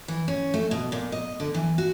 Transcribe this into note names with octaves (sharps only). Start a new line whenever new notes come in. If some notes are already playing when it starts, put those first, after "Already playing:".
E3
C#4
A3
B2
A#2
D#5
D3
E3
F#4